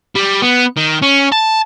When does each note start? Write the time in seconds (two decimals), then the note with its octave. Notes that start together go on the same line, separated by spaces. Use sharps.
0.15 G3
0.42 B3
0.77 D#3
1.03 C#4
1.32 A5